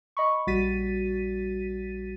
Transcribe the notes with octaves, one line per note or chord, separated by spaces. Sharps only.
D#5 B5 C#6
A#1 G3 F#4 A6 B6 D#7